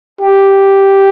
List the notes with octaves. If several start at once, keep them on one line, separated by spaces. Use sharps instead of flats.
G4